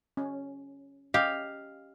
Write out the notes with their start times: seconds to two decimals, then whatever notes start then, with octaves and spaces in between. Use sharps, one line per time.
0.17 C#4
1.14 C#4 G4 D#5 F5